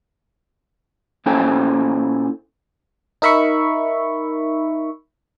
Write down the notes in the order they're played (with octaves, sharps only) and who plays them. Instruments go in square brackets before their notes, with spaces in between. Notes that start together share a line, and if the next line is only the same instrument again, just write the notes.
[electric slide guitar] A#2 C#4 E4 A4 C5 G5
[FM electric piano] D#4 A#4 E5 B5 C#6